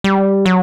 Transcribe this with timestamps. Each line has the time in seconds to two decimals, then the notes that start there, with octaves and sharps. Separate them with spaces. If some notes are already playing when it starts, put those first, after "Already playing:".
0.04 G3
0.46 F#3